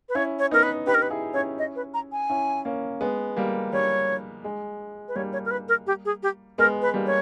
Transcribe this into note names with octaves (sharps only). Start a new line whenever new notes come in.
B4
C#4 E4 C#5
C#5
B3 D#4 A#4
B4
D#4 G4 B4
A#4
B4
E4 G#4
C#4 E4 C#5
D#5
B4
A#5
G#5
C#4 E4
A#3 C#4
G#3 B3
G3 A#3
G3 C#5
G#3
B4
G3 A#3 C#5
C#5
A#4
B4
A#4
G4
G#4
G4
G#3 B3 A#4
B4
G3 A#3
C#5